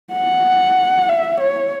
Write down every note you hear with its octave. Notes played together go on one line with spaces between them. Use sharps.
F#5
E5
C#5